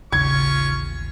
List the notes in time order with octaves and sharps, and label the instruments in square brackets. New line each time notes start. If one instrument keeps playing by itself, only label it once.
[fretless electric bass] A1 D#2 [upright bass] C#3 [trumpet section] C#4 F4 C#6 [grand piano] G#6